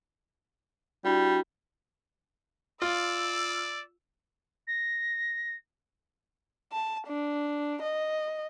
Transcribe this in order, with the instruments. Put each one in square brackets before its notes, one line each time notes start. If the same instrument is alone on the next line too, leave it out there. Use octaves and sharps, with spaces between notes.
[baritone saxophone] G3 [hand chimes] D4 E4 F#4
[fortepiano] F4 [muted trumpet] D5 [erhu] E6
[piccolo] A#6
[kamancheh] A5
D4
D#5